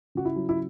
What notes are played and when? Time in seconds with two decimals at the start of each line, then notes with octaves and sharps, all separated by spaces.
0.15 C#3 F#4
0.25 E4
0.36 F#3
0.49 E4